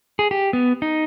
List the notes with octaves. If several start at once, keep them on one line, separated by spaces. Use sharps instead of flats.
G#4
G4
B3
D#4